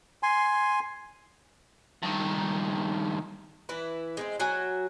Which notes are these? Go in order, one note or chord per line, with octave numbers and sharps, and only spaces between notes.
G#5 C6
G2 D#3
E3 E4 B4
G#3 B3 C4
F#3 F#4 G#5